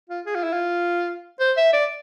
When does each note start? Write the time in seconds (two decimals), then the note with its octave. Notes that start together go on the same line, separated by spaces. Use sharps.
0.10 F4
0.26 G#4
0.35 F4
0.44 E4
0.53 F4
1.40 C5
1.57 E5
1.73 D5